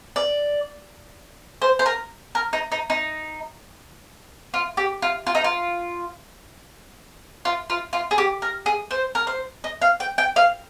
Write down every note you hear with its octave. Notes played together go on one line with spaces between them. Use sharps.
D5
C5
C5
A#4
A#4
D#4
D#4
D#4
F4
G4
F4
F4
D#4
F4
F4
F4
F4
G#4
G4
A#4
G#4
C5
A#4
C5
D#5
F5
G5
G5
F5